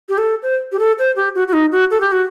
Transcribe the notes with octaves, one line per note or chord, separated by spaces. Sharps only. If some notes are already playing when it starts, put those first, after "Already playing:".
G4
A4
C5
G4
A4
C5
G4
F#4
F#4
D#4
F#4
A4
G4
F#4